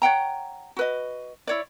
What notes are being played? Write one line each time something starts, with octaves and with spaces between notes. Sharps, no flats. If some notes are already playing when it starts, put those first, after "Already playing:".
C#5 F#5 G5 A#5
F#4 B4 D#5
E4 C#5 D5